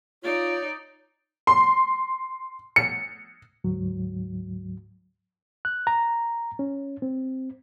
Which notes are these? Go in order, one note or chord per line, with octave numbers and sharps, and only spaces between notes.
D#4 F4 C#5 D5
C6
C#7
D2 G#2 F#3
F#6
A#5
C#4
C4